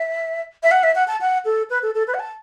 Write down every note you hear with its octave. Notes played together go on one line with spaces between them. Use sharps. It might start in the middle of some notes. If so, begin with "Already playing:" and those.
Already playing: E5
E5
F#5
E5
F#5
A5
F#5
A4
B4
A4
A4
B4
F#5
A5